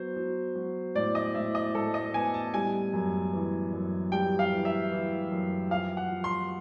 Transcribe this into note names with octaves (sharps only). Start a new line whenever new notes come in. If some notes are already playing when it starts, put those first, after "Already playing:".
Already playing: F#3 B3 C5
F#3
F#3
A2 D5
D#5
A2 E5
D#5
A2 A4
D#5
B3 G#5
A5
G3 G#5
F#2
E3
F#2
G3 G5
F5
E3
E5
E3
F#2
F3 F5
F#5
F3
C6